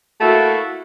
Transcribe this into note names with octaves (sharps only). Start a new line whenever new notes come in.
A3 A#3 E4 F#4